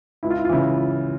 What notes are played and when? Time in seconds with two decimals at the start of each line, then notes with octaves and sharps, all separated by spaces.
0.23 C#2 E4
0.30 F4
0.38 E4
0.45 F4
0.49 C#3 E3 E4